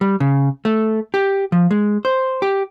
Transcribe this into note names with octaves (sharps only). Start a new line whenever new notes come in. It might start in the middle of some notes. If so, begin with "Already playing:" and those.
G3
C#3
A3
G4
F3
G#3
C5
G4